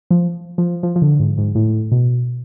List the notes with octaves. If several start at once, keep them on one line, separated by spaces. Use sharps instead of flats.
F3
F3
F3
F3
D3
G#2
G#2
A2
B2